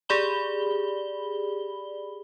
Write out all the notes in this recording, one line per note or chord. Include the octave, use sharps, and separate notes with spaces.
G4 G#4 D5 B5 G7